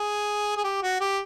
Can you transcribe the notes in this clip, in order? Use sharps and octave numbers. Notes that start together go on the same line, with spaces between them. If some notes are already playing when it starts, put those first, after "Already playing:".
Already playing: G#4
G#4
G4
F#4
G4